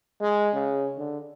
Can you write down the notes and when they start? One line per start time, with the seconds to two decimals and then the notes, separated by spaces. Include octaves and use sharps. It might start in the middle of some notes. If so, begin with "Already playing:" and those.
0.21 G#3
0.53 C#3
0.97 D3